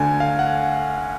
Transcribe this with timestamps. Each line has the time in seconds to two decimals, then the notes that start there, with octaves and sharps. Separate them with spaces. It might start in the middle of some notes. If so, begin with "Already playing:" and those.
Already playing: D2 D3 G#5
0.20 F5
0.39 F#5